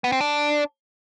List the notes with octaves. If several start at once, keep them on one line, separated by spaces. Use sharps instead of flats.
B3
C4
D4